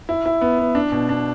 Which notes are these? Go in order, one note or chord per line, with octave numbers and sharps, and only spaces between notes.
E4
E4
B3
B3
D4
B2
D4